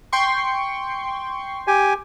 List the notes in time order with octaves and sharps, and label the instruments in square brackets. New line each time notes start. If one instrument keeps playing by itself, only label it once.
[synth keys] G5 C6 C#6
[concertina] G4 G#5